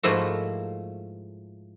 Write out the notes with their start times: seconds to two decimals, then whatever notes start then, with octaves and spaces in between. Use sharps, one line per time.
0.03 G#2 F3 A3 A#3 E4 F#4